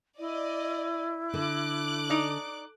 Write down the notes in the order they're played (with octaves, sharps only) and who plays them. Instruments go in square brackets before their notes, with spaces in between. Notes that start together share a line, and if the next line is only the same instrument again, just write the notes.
[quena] E4 [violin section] D5 D#5
[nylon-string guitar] D3 [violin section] D6 F#6
[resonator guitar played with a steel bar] D#4 D5